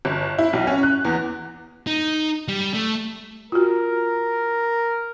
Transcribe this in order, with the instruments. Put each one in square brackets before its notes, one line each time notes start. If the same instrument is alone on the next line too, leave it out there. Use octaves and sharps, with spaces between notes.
[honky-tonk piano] G1
E4
B1
C#4
F#6
E2
[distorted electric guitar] D#4
G3
A3
[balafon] F4 F#4 [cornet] A#4